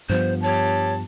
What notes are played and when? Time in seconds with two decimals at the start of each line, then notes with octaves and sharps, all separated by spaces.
0.09 G2 F3 B3 C5
0.43 G4 C#5 A5